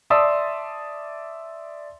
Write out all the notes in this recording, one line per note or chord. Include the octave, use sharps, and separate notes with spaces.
D5 E5 A5 C6 D#6 E6